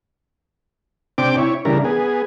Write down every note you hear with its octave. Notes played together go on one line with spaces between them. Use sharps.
C3 C4 D4 G5 D6
E4 C#5
C#3 E3 G3 D4 A#4
B3 G#4